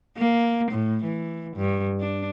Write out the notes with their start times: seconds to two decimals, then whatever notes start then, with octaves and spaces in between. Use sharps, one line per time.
0.18 A#3
0.71 A2
1.04 E3
1.56 G2
2.00 D4